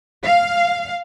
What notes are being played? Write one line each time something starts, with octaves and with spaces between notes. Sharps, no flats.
F5